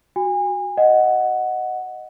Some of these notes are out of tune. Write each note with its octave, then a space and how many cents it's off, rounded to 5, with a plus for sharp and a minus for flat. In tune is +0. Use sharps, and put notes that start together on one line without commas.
F#4 +0 G#5 -35
D#5 +0 F#5 +0